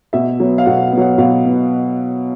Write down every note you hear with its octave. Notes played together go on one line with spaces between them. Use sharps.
B2 E5
F#3 B3
F5
B2 F#5
B3
F#3 F#5
B2 F5
B3